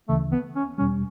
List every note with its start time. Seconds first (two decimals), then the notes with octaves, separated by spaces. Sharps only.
0.09 D2 C#3 E3 A3
0.32 B3
0.56 C#4
0.78 E2 B2 G3 C#4